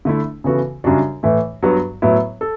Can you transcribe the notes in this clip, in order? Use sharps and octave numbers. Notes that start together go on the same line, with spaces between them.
D3 A3 E4
C#3 E3 B3 F#4 A4
F#2 C#3 G3 D4 F#4
A2 E3 A3
G2 F#3 B3 F#4
A2 F#3 B3 E4
A4